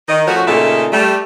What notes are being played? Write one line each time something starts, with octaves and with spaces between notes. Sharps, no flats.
D#3 D#5
F3 A3 C#4 F#4
A#2 C#3 A3 D#4 A4 E5
G3 A3